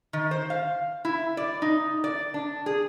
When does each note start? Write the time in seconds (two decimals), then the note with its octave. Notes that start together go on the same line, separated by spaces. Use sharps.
0.13 D#3
0.31 C5
0.50 F5
1.05 E4
1.37 D5
1.62 D#4
2.04 D5
2.34 D4
2.66 G#4